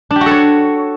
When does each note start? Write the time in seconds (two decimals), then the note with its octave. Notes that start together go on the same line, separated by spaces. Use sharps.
0.11 D4
0.16 G4
0.21 F#4
0.26 A4
0.31 C#5